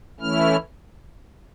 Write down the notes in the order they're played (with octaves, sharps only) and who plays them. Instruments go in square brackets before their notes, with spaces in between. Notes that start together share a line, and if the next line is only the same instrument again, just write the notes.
[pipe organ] E3 A3 C#4 E4 F6